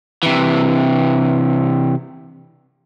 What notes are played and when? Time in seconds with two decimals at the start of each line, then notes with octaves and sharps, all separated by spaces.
0.23 C3 E3